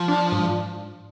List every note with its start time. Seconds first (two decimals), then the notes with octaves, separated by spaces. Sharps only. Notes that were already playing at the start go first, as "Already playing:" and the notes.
Already playing: F3
0.08 D4
0.32 G#2